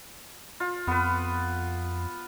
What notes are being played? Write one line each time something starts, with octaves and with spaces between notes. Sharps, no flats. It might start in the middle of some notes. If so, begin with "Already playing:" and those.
F4
F2 B3 B4